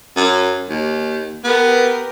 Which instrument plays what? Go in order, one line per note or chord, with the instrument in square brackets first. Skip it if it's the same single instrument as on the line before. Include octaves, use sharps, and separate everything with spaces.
[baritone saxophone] F#2
D#2
[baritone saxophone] B3 [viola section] G4 A#4 B4